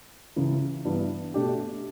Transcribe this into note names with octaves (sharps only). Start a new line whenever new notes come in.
C#2 C#3 E3
G2 E3 B3
B2 A3 D4 G4